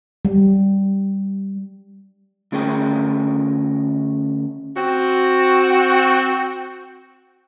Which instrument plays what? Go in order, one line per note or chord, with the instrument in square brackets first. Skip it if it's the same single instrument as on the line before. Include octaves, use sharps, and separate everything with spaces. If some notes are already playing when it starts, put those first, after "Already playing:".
[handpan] G3
[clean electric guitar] D3 A3 C#4 G#4 A#4 G5
[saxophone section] C4 F#4